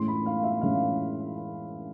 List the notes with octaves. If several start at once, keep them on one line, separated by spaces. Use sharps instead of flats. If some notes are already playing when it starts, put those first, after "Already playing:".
Already playing: A2 E3 G#3 C#4 C6
B5
F5
E5
A2 E3 G#3 C#4 F5